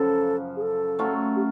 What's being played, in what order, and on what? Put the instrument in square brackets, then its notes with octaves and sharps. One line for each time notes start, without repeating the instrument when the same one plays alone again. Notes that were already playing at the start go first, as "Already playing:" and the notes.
Already playing: [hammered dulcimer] F#2 C#3 F3 [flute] A4
[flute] G#4
A4
[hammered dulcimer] F#3 A3 C#4 F4
[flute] G4